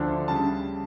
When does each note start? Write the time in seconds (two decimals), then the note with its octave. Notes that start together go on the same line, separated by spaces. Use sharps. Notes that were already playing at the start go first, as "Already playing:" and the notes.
Already playing: D2 D3 F3 A3 D4
0.28 C#3 G3 A5